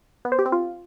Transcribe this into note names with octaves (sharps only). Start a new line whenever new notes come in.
B3
C5
G4
C4
F4